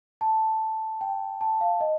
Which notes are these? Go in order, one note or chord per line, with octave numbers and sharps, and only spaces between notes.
A5
G5
A5
F5
D#5